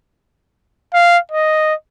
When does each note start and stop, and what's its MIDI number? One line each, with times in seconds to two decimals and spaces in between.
0.94 1.18 77
1.31 1.74 75